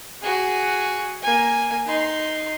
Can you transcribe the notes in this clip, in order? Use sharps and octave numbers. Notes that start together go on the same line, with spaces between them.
F#4 G#4
A#3 G#5
D#4 C6